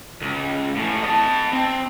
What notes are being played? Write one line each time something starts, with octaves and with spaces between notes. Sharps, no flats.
C#2
A2 C#4
D#5 A5
C4